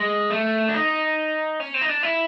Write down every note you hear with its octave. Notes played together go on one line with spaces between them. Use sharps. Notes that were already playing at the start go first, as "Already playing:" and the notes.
Already playing: G#3
A3
D4
D#4
C#4
C4
D#4
D4
E4